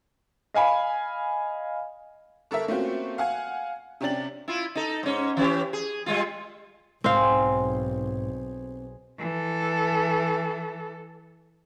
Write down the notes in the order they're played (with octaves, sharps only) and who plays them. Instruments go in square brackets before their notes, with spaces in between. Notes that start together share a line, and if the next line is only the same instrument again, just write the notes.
[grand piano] D#5 F5 G#5 B5
[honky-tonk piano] G1 A4 A#4 E5
A3 A#3 C4 C#4 F4 F#4
F5 F#5 G#5
C3 C#4 D4 G4 A6 F#7
[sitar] E4 F4
D#4 A4
G#2 C#4
E3 C#4 G4
G#4
G3 G#3 F4
[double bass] B1 [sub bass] G#2 [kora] C4 F5 [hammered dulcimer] G#4 C5
[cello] E3 A4